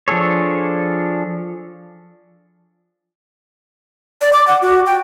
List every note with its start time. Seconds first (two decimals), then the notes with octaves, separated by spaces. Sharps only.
0.08 F3 D4 G#4 A4 C#5
4.21 D5
4.33 D6
4.47 F#5
4.62 F#4
4.86 G5